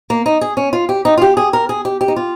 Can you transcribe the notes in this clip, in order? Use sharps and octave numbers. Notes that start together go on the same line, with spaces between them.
A#3
D#4
G#4
C#4
F4
G4
D#4
F4
G4
G#4
A#4
G#4
G4
G4
D#4
F4